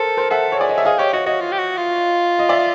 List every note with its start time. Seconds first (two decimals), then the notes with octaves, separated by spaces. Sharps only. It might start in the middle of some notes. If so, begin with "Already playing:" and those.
Already playing: A4 A#4 C5
0.17 A#4 C5
0.30 A4 E5 F#5
0.52 C#5
0.58 G#4 D5
0.69 D#5
0.78 E5
0.85 G#4 D#5 F5
0.99 G4 C#5 D#5
1.13 F#4 C#5 D#5
1.26 F#4 C#5 D#5
1.41 F4
1.52 G4
1.59 F#4
1.77 F4
2.39 D#5
2.49 D5 E5